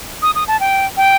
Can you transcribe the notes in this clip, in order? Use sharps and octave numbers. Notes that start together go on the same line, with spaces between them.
D#6
D#6
A5
G5
G5